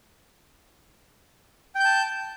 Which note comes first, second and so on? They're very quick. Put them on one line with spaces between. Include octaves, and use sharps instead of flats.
G5 G6 A5